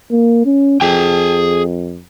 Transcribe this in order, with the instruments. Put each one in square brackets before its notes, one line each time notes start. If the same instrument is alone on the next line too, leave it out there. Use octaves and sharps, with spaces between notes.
[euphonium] A#3
C#4
[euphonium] F2 [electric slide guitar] G#4 G5